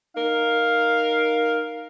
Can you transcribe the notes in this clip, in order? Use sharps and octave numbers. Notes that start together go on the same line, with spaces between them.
D#4 A#4 F5